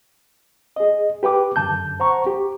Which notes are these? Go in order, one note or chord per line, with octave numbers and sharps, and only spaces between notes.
G#4 D#5
G4 B4 G5 D6
F#2 D3 A5 G6
C5 F#5 A#5 C#6
G4